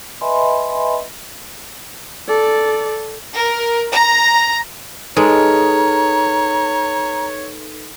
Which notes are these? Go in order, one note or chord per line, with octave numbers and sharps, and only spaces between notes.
B4 D#5 E5 G#5 B5 C6
A4 D5
A#4
A#5
G#3 D#4 A4 B4 C#5 A#5